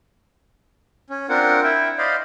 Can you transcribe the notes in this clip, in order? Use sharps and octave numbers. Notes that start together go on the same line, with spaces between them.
C#4
C4 D4 F4 A#4 F#5
E4 E5 G5
C5 D5 D#5 F5 B5